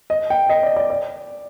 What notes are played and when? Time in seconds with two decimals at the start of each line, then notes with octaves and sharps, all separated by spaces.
0.10 D#5
0.30 G5
0.49 D#5
0.63 D5
0.76 D5
0.90 D5